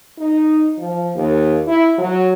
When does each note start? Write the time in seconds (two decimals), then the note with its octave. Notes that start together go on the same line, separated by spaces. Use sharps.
0.18 D#4
0.78 F3
1.16 D#2
1.67 E4
1.98 F#3